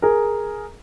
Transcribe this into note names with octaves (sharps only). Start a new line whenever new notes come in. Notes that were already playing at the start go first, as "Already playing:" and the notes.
G#4 A#4